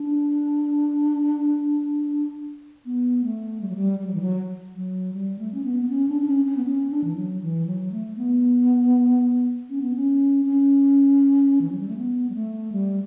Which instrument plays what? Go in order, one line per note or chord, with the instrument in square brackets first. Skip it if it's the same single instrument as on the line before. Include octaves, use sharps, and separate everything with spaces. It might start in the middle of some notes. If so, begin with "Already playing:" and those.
Already playing: [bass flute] D4
B3
A3
G3
F#3
G3
G3
F#3
E3
F#3
F#3
G3
A3
C#4
B3
B3
C#4
D4
D4
C#4
C#4
B3
C#4
D4
E3
F#3
E3
F#3
A3
B3
C#4
B3
C#4
C#4
E3
F#3
G3
A3
B3
G3
A3
G3